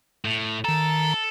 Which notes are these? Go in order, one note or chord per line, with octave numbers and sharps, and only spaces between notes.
A2
D#3 A4 A#5